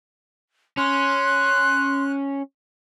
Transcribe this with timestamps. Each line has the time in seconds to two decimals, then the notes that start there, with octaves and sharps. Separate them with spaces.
0.78 C#4 C6 F#6